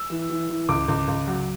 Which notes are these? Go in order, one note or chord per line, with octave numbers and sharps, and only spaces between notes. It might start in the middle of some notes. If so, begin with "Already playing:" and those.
Already playing: E6
E3
E3
E3
C#2 D6
C#2
C#2
F#3